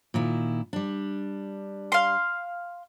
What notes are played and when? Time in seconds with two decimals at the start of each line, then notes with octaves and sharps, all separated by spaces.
0.14 A#2 D#3 E4
0.73 G3 D4
1.92 F5 C6